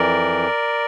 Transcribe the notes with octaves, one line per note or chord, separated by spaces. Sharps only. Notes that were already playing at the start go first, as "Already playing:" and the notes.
Already playing: F2 E3 A#4 D5